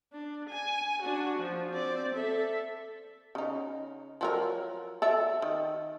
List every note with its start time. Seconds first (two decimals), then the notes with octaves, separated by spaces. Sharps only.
0.13 D4
0.49 G#5
1.02 D4 F#4
1.40 F3
1.73 C4 D5
2.15 A4 E5
3.35 C#3 D#4
4.21 F3 F#3 A#4
5.02 A4 D5 E5
5.42 D#3